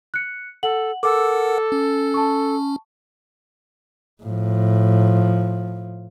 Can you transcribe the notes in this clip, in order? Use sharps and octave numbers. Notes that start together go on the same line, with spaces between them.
F#6 C#7
A4 F#5 F#7
A4 A#4 F#5 D6 E6
C#4
A5 C#6
A2 F3